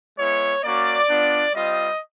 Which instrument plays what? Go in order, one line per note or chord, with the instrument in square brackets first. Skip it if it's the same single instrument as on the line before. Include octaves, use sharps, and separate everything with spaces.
[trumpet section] G#3 B3 E4 C#5
A#3 C#4 F#4 D5
B3 D4 F4
G3 C4 F4 D#5